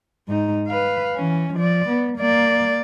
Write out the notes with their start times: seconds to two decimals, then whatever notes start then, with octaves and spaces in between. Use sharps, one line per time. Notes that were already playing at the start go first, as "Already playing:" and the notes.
0.28 G#2 D#4
0.68 B4 F5
1.15 E3 C#4
1.55 F3 D5
1.89 B3
2.18 A#3 D5